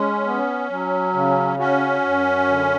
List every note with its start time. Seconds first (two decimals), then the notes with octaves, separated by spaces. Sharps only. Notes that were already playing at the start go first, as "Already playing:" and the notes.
Already playing: G#3 C#4
0.25 B3
0.70 F#3
1.14 C#3
1.59 C#4 F#4
2.04 F#2
2.47 D3